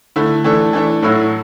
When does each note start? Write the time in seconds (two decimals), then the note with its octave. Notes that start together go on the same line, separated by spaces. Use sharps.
0.16 D3 A3 E4
0.44 E3 A3 D4 A4
0.73 E3 A3 D4 A4
1.02 A2 F#3 A3 E4